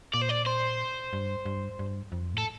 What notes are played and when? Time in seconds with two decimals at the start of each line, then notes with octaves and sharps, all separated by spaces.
0.14 A#2 D5
0.22 C5
0.29 D5
0.46 C5
1.13 G2
1.45 G2
1.79 G2
2.12 F2
2.34 A2 A4